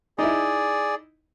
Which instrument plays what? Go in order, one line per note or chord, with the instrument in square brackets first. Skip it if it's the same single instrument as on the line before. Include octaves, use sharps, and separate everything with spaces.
[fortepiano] D#4 E4 [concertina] G#4 D5